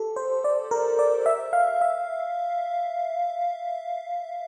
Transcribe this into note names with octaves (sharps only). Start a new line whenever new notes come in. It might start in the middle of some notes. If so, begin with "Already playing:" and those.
Already playing: G4 A4
C5
D5
A#4
D5
E5
F5
E5